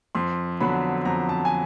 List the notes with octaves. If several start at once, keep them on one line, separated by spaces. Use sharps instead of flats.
F2 C6
D3 F#3 B3 B5
F2 A#5
A5
G#5